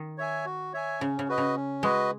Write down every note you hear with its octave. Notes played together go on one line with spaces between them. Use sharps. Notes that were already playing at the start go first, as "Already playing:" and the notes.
Already playing: D#3
C#5 E5 G#5
F#4
C#5 E5 G#5
C#3 C#4
C#3
F#4 B4 D#5
C#3
C#4
G#3 F#4 B4 D#5